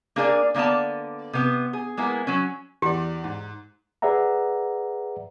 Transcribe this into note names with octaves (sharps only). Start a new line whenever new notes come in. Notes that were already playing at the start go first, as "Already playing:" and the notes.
A#3 D4 G#4 A#4 C5 D5
D3 A#3 B3 D5 A5
C3 B3
G#4
G#3 A#3 B3 E4
F#3 C#4
E2 G4 D5
G#2
G#4 B4 D5 E5 F#5 A#5